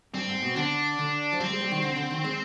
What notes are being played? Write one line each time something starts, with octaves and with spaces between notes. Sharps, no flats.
G2 C4
G#2
B2
D3 D4
D3
F3
G3 C4
G#3
G3
D#3
D3
D3
D#3
G#3